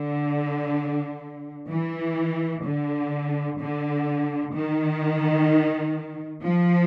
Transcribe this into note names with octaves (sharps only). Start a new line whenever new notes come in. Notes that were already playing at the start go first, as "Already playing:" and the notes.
Already playing: D3
E3
D3
D3
D#3
F3